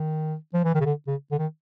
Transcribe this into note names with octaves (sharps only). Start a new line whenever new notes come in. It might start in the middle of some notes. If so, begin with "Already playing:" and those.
Already playing: D#3
F3
E3
D#3
C#3
D3
C#3
D3
D#3